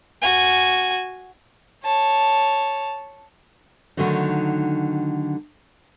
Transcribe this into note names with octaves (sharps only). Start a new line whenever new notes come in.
F#4 G#5
C#5 A5
D3 D#3 F#3 A3 D#4